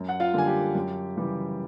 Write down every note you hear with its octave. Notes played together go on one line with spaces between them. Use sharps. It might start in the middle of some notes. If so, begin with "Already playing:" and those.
Already playing: F#2
F#5
F4 F5
D3 G3 A#3 G#5
G4 G5
F#2
C#3 E3 G3